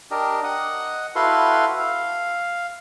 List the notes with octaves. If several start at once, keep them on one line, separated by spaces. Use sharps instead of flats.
D4 G4 A#4 D#5
D#5 F#5 D#6
E4 F#4 A4 B4 F5 C6
F5